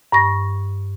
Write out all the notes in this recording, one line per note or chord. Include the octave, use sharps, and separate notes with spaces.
G2 C#6 A#6